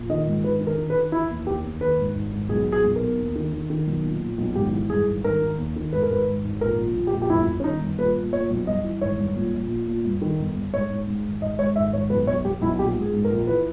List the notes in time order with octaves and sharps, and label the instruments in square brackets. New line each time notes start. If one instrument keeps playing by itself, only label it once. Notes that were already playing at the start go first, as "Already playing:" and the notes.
Already playing: [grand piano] A#1
D#3 D#5
G#2
D#3 B4
D#3
A#4
D#3
B4
D#3
E3 E4
D#2
D#2 G4
D#2
D#3 B4
G#1
G#1
G#1
B1 G#4
B2
G#4
B1
A#4
B2
D#2
D#3
D#3
D#3
B1
A#2
A#2
B1
G#1 G4
E3
G2 G#4
G#1
D#3 A#4
D#3
D#2
D#3
G#1 B4
A#4
G#1 B4
G#1
G#1
A#1 A#4
A#2
A#1
G4
A#1
G4
G1 E4
G1
C#4
D#3 D#4
G2
A#2 B4
A#2
A#2 C#5
B1
G2 D#5
E3
G#1 C#5
G2
A#2
A#1
A#2
A#2
G2
D#3
G1
G2
G#2 C#5
G#2
G#2
G#1
G#1 D#5
G#2 C#5
G#1 E5
G#1 C#5
B1 B4
B1 C#5
B1 G4
B1 E4
A#1 G4
G#2
G#4
G#2
A#4
A#1
E3 B4